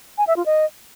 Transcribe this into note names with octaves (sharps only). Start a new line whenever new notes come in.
G#5
E5
F4
D#5